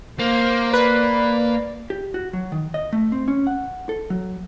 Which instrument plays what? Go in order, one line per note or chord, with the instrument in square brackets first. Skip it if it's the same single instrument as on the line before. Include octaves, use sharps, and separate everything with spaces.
[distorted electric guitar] A#3 [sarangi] C5
[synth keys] B4 [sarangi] D5
[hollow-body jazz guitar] G4
F#4
F#3
D#3
D#5
A3
C4
C#4
F#5
A4
F#3